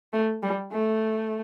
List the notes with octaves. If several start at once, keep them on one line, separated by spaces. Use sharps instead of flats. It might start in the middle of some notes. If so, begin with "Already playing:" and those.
A3
G3
A3